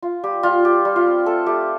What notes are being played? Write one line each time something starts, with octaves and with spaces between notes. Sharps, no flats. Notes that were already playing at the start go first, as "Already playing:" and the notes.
F4
G3 G4
G3 F4
F4 G4
G3
F4
C4
A3 A4
A3 G4